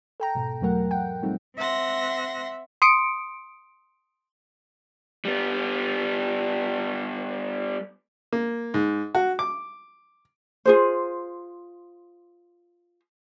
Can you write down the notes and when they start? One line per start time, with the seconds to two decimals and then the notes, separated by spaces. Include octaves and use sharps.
0.20 A4 G5 A#5
0.35 G#2 B2
0.61 E2 B2 F#3 A3 A#4 F#5
0.91 F#5 G5
1.22 F3 G3 A3 C4 D#4
1.56 C4 E5 F#5 C6 A#6
2.82 C6 D#6 C#7 D7
5.25 G3 B3
8.33 A#3
8.74 G#2
9.15 F#4
9.39 D6
10.66 F4 G#4 C5